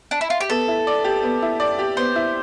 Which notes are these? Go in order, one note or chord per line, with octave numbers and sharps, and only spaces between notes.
D4
E4
F4
G4
B3 A4
E4
D5
G4
B3
E4
D5
G4
B3 C5
E4